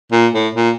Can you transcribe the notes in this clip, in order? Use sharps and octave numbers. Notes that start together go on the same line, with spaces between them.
A#2
A2
A#2